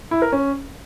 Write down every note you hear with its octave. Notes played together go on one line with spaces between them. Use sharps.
E4
A#4
C#4